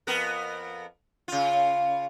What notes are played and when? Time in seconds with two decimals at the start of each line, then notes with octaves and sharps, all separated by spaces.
0.07 F2 B3 A#4
1.28 C#3 F4